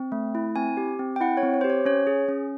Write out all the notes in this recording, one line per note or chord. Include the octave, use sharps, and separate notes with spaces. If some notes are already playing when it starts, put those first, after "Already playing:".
Already playing: C4
A3
E4
C4 G#5
G4
C4
G5
E4 F#5
C#5
C4
C#5
C5
G4
C#5
C#4 C#5
G#4
C#4